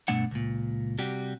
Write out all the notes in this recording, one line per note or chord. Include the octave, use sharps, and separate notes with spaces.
G2 B2 A3 D4 F#5
C#2 A#2
C3 G3 F#4 G4